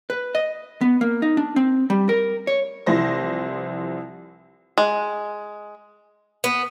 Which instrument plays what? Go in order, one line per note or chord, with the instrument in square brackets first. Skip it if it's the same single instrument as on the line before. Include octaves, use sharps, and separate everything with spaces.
[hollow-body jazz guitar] B4
D#5
B3
A#3
D#4
D4
C4
G3
A#4
C#5
[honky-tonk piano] C2 E3 F3 C5 A#6
[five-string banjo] G#3
[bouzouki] B3